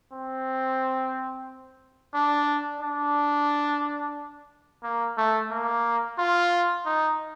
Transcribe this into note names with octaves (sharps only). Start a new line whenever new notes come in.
C4
D4
D4
A#3
A3
A#3
F4
D#4